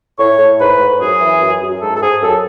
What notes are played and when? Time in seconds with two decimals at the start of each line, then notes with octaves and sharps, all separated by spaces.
0.18 A2 C#5
0.39 A2
0.59 G#2 B4
0.79 G#2
1.00 F#2 G#4
1.20 E3
1.41 F#2
1.61 F#2
1.82 G#2 A4
1.95 A4
2.02 G#2 G#4
2.22 F#2 A4